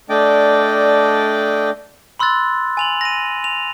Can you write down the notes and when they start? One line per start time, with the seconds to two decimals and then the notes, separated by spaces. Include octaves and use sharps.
0.10 A3 D4 D5 D#5 G5 D6
2.19 B5 C6 E6 F#6 A6
2.77 G#5 F7 F#7
3.01 A#6 D#7
3.44 F7